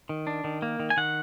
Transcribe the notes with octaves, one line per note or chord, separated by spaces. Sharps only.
D#3
D4
D#3
A#3
D#3
G#5
D#3 F#5